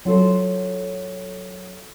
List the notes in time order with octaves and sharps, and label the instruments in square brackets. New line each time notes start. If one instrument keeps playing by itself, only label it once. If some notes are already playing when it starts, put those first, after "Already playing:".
[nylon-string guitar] F#3 F4 A4 C5